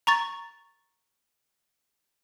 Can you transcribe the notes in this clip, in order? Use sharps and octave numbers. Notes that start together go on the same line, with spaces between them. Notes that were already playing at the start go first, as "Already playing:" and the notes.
A#5 C#6 A6